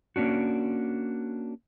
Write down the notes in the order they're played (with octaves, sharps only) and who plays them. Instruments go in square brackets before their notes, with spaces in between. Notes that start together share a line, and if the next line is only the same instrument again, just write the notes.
[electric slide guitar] A#3 C#4 D4 F#4